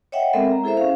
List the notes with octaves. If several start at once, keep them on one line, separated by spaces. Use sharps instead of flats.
C#5 D#5 E5 F#5 G5
G#3 B3 C4 A4 A#4 E5
A#5
E4 G#4 A4 C5 E5
C#4 F5